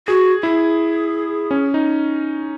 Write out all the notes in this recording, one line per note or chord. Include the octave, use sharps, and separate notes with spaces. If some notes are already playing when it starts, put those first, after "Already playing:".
F#4 G#4
E4 G#4
C#4
D#4